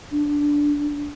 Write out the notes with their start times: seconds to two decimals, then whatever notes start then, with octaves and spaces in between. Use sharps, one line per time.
0.11 D4